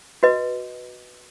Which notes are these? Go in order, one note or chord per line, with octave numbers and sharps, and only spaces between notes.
F#4 B4 D#5